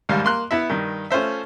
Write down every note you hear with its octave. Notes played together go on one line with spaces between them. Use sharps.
D#2 G#2 G3 F5
A#3 C6 F#6
B3 E4 E5
G2 D#3
A3 C#4 F4 C5 E5